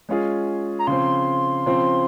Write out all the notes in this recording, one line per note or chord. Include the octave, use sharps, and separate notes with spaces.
G#3 C#4 F4 G#4
A#5
C#3 F3 C4 C6
C#3 F3 C4